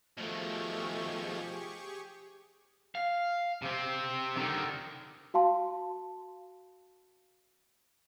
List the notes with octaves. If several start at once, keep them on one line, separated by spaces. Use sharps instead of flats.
B2 D#3 F3 A3 G4 G#4 C#6
F5
C3 C4
D3 D#3
F#4 F5 A5 C6